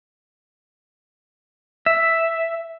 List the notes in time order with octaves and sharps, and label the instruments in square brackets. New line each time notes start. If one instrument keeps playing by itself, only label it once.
[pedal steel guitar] E5